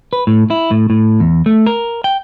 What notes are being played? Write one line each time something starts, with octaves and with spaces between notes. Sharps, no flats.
B4
A2
E4
A2
A2
E2
A3
A#4
G5